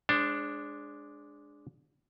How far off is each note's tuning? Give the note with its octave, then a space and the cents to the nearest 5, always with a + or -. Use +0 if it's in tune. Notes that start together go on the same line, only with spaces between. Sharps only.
G#3 +0 D4 +0 C5 +35